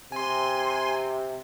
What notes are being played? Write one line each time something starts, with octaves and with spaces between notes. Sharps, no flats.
C3 G#5 C6